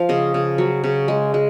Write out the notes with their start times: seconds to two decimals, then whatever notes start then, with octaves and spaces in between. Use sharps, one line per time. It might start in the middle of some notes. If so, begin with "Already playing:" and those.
Already playing: F3 F5
0.09 C#3 D#5
0.34 C#3
0.58 F#3
0.84 C#3
1.08 G#3
1.34 G#3